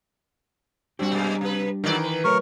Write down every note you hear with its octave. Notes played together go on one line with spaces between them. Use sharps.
G3 C4 D4 F#4 G4
B2 G#3 A#3
C3 B4
G2 D#3 E3 F#3 D5
B4
F#3 A3 A#4 C#5 C#6